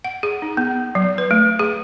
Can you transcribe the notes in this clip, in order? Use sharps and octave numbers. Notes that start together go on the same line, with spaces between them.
F#5
G#4
D#4
B3
F#3
B4
A3
G#4